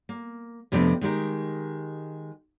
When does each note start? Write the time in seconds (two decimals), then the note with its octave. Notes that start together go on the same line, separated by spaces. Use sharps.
0.09 A#3
0.72 F2 C3 F3 A3 B3 D4
1.01 D#3 G#3 G4 A#4